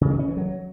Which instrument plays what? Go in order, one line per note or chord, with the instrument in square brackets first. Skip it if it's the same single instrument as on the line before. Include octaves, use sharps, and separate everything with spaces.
[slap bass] C#3
G#3
C#4
E3
F#3